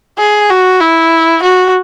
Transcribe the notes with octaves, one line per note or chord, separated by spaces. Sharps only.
G#4
F#4
E4
F#4